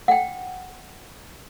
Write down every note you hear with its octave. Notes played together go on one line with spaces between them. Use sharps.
F#5 G5